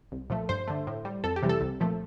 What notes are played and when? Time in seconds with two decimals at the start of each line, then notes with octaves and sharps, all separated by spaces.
0.12 C2
0.30 A#2 F3 A3
0.49 G2 C5
0.67 D3 A3
0.87 A2
1.05 G3
1.24 F2 A4
1.36 G4
1.43 C3 E3 G3
1.49 A4
1.61 C2
1.80 A#2 F3 A3